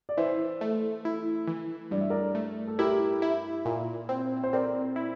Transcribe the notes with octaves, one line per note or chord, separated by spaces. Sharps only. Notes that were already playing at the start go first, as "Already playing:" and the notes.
D5
E3 C5 E5
A3
E4
E3
G2 D5
E5
A#4 D5
A3
A4
E4 G4 A#4
E4
A#2
C4
C5
C4 A#4 D5
E4